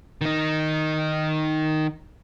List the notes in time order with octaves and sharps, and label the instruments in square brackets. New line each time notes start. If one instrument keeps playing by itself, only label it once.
[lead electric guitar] D#3 D#4